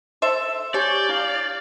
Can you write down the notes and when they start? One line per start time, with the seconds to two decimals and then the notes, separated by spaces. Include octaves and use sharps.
0.22 A4 C5 E5
0.74 G4 C#5 D5 G#5 G6
1.09 E4 F5